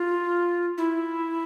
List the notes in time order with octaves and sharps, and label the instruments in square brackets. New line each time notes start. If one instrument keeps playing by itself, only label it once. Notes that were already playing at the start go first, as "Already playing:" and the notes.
Already playing: [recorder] F4
E4